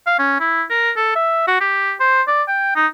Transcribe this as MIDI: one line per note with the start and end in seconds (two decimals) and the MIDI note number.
0.06 0.15 77
0.19 0.37 61
0.40 0.63 64
0.70 0.91 70
0.96 1.15 69
1.15 1.46 76
1.47 1.61 66
1.61 1.93 67
2.00 2.22 72
2.28 2.43 74
2.48 2.72 79
2.76 2.87 63